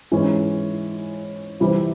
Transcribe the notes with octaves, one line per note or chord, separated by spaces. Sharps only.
G#2 E3 G#3 C#4
C3 E3 G3 C4